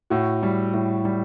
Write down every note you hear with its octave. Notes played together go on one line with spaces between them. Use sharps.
A2 F#4
G3
A2
G3